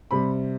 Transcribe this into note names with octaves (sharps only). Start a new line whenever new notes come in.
C3 G3 B5